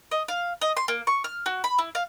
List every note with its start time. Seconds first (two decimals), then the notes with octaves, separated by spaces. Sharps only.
0.11 D#5
0.28 F5
0.61 D#5
0.77 C6
0.88 A#3
1.07 C#6
1.24 F6
1.46 F#4
1.64 B5
1.78 E4
1.95 F5